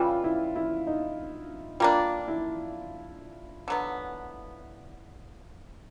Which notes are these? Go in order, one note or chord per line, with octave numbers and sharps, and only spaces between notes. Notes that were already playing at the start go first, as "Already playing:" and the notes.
Already playing: C#3 E3 G3 F4
E4
E4
D#4
G3 A#3 D4 F4
E4
D3 F#3 B3